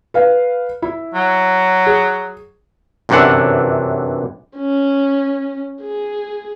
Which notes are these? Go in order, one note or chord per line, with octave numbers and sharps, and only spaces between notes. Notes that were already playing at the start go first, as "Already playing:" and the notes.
B4 F5
E4
F#3
G#4
G1 F#2 C3 E3 D4 F#5
C#4
G#4